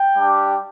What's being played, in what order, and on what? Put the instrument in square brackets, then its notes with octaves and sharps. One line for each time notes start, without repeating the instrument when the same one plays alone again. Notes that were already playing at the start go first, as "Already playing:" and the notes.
Already playing: [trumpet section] G5
G3 D4 G4